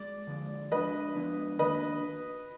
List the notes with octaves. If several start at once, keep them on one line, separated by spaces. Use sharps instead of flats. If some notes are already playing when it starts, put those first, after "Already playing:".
Already playing: G#3 D5
D3 F3 G#3
F3 G#3 B3 D4 B4 D#5
F3 G#3 B3 D4
D#3 A#3 D4 B4 D#5